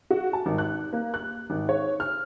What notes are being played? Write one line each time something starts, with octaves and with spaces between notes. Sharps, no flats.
F#4
A5
G#1
F#6
A#3
F#6
G#1
C#5
F6